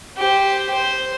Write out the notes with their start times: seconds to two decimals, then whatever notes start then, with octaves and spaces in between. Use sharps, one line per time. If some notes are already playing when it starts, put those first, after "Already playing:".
0.17 G4 C5
0.74 C5